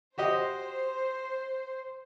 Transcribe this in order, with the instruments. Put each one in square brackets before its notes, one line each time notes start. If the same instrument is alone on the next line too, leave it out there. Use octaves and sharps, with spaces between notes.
[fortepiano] F#4 G4 D#5 [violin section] C5